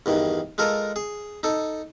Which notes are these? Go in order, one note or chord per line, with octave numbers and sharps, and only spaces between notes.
E2 G2 D#3
G#3 F4 A4 A#4
G#4
D#4 A4